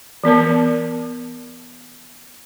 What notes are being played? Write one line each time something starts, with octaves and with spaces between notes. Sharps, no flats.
E3 B3 A#4 A5